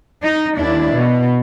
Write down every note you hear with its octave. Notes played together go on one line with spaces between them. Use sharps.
D#4
D#2 D4 E4
B2